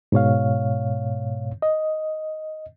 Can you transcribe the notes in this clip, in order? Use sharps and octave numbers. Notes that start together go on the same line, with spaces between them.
G#2 B2 C#5 F5
D#5